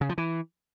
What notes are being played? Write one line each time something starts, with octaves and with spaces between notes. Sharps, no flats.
C#3
F3
E3